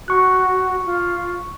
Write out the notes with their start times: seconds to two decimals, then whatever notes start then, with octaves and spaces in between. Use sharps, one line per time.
0.08 F#4 C#6 F#6
0.86 F4